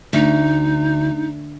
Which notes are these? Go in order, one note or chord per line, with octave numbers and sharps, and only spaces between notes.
D2 D#4